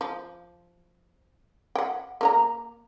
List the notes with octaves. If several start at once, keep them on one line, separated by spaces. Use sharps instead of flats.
F3
F#5 G5
A#3 A#4 A#5